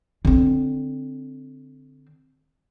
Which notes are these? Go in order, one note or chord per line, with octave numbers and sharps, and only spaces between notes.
D3 C4